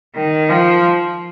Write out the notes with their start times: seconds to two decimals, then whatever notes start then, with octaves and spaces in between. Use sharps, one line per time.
0.16 D#3
0.49 F3